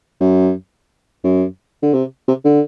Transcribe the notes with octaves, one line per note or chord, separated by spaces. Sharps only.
F#2
F#2
D3
C3
C3
D3